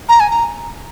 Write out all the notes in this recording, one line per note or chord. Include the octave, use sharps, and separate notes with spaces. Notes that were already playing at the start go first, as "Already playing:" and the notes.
A#5
G#5
A#5